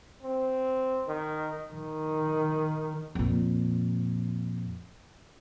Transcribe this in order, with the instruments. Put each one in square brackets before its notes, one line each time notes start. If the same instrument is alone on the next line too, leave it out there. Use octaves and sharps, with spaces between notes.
[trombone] C4
D#3
[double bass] D#3
[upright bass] F2 A#2